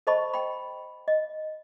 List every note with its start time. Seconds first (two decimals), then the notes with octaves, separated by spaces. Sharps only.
0.07 A4 C5 D#5 A5 B5 C#6
0.34 G5 B5
1.08 D#5